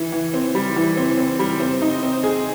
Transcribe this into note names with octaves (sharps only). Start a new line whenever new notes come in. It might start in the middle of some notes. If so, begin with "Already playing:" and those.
Already playing: E3
E3
C4
G3
E3
C4
C4
G3
C4
D#4
C4
G#4